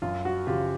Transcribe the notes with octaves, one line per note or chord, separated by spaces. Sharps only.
F#2 F4
F#4
C#3 F3 F4 G4